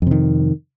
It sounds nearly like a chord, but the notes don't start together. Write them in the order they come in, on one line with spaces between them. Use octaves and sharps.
F2 C3 D#3